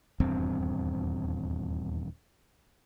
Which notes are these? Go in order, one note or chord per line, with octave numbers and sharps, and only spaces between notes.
D#1 E2 G2 C4